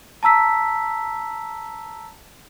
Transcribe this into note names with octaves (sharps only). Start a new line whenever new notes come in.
A5 A#5 E6 B6